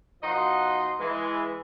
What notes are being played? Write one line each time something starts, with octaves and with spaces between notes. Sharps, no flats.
B2 F3 D#4 D#5 F#5 C6
E3 G#3